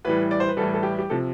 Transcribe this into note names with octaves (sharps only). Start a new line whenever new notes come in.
A2 E3 G3 B4
D5
C5
B4
A2 E3 G3 A4
A4
G4
G4
C3 F3 A4